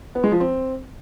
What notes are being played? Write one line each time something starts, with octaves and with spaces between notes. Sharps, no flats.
B3
G#3
F3
C4